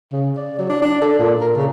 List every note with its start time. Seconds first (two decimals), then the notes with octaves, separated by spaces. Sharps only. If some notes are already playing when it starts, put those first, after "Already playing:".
0.12 C#3
0.37 D5
0.58 F#3
0.70 D4
0.82 D4
1.02 A4
1.19 A#2
1.41 A#4
1.56 C#3